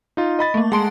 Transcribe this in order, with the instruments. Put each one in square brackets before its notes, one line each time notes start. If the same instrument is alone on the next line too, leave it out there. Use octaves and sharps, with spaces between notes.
[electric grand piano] D#4 F4
D#5 B5 A6
[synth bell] A3 A#3
[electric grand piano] G#3 A5 [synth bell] F#5 C6 D7